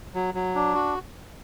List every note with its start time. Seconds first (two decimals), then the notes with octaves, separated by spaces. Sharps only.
0.15 F#3
0.34 F#3
0.55 D4
0.75 F#4